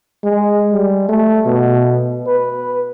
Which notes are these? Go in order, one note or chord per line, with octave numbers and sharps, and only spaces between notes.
G#3
G3
A3
B2
B4